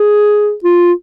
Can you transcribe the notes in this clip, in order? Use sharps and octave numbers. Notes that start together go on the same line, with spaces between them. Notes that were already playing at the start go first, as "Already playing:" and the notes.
Already playing: G#4
F4